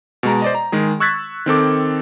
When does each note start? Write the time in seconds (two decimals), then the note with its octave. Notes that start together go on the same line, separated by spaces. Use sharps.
0.23 B2 G#3 A#5
0.42 C5 D5 D#5
0.55 A#5
0.72 D#3 G#3 G#4
1.00 C#6 E6 F#6 G#6 A6 B6
1.46 D#3 C4 A4 D6